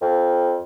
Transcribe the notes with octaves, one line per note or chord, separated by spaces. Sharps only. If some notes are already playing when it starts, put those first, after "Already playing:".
F2